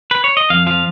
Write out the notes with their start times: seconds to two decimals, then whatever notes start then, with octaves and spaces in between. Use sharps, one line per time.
0.11 B4
0.24 C#5
0.37 D#5
0.50 F2 F5
0.66 F3 F5